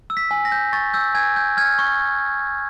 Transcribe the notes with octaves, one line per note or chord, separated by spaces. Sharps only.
E6
B6
G#5
A#6
G6
C#6 A6
E6 G6
G#5 G#6
G6
F6 G#6
C#6